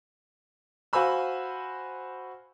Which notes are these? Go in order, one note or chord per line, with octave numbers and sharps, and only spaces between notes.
F#4 C5 F5 G#5 B5 E6